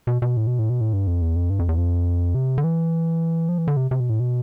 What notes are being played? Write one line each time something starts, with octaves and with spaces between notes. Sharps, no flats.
B2
B2
A2
B2
A2
B2
A2
G2
F2
E2
F2
G2
F2
E2
F2
C3
D3
E3
F3
E3
D3
C3
C3
B2
A2
B2